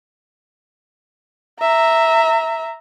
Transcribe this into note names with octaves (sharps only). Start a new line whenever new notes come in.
E5 A#5